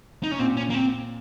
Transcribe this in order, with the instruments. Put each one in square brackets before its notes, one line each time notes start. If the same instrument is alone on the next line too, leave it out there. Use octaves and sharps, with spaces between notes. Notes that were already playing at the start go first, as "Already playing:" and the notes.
[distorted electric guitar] D#4
C#4
[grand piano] A#2 [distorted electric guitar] C4
[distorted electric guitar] C#4
A#3
C4